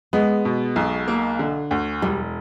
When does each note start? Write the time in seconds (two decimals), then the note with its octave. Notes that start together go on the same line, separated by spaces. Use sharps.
0.13 G#3 B3
0.45 B2
0.76 B1
1.08 A#3
1.39 D3
1.71 D2
2.02 E1 G3